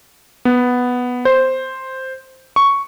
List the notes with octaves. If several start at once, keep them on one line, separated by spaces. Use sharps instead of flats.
B3
C5
C#6